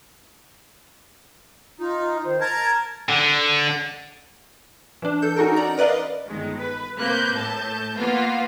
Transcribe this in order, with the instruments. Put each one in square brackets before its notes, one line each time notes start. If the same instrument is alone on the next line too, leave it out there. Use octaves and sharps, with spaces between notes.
[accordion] D#4 [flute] F4
[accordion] D#3 [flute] C5
[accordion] A#4 A5 A#5 [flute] G#6
[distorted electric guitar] D3
[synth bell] E3 D4
A4 G6
C#4 D#4 F#4 A4 A#4
D5 A#5
A#4 B4 D5 D#5 F5
[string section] G1 D#3 G#3
B4
C3 A#3 B4 F#6 G6
A2 A5 G6
A#3 B3 F4 B4 F5